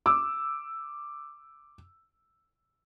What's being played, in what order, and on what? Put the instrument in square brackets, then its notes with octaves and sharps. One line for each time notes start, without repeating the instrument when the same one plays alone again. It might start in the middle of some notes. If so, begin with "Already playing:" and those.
[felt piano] D6 E6